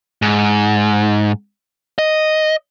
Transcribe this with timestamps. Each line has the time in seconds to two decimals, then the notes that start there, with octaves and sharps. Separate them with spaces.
0.22 G#2
1.98 D#5